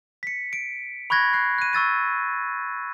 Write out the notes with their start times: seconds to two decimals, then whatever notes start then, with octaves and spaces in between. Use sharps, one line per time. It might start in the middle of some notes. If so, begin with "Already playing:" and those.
0.23 B6 C#7
0.53 D7
1.10 B5 C#6 F#6 G#6 A#6
1.33 F#6 C7
1.58 F#6 D#7
1.73 C#6 E6 A6 D#7